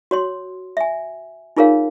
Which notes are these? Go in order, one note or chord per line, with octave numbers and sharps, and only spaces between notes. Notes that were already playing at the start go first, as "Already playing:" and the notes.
F#4 C#5 C6
E5 G#5
D#4 F4 G#4 A#4 C#5 F5